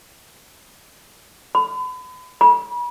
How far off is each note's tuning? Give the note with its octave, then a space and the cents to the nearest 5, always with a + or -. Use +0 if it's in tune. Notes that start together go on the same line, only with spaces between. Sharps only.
B5 +35
B5 -35